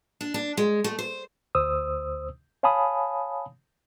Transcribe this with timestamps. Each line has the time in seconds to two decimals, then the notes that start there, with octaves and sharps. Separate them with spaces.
0.21 D4
0.34 D4
0.57 G#3
0.84 A3
0.99 C5
1.55 D2 C5 D#6 E6
2.63 C#5 F5 G#5 A5 B5 D#6